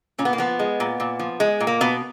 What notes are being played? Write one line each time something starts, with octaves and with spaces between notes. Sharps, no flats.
A#2 C#4
B3
A#3
F3 B3
G#3
A#2
A#2
F3
G#3
A#2
A#3
B2 B3